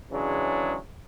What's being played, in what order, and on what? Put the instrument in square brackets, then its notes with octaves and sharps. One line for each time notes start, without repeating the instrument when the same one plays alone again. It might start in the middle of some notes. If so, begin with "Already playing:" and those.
[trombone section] C#3 E3 F#3 G#3 D4